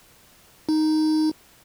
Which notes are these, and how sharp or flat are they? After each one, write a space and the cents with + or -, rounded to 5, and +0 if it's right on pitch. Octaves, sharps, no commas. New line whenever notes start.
D#4 +0